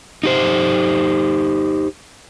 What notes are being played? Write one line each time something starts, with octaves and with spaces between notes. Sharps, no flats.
D#4 G4 C5